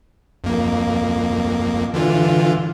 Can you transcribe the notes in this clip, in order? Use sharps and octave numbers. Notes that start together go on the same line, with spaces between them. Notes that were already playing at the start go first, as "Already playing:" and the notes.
F2 A#3
D3 E3 F4